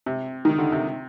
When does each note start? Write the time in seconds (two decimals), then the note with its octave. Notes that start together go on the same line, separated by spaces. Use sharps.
0.06 C3
0.45 D#3
0.58 D3
0.72 C3